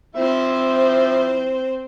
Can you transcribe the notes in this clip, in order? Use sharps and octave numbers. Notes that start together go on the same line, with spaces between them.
F3 C4 E4 C5 E5